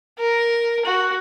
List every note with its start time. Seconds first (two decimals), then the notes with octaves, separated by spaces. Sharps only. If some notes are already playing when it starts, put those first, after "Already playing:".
0.19 A#4
0.85 F#4